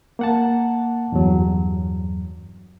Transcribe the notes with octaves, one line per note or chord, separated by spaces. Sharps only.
A#3 F#5 A5
E2 G2 F#3